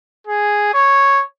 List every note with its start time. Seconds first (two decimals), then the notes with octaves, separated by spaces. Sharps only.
0.27 G#4
0.74 C#5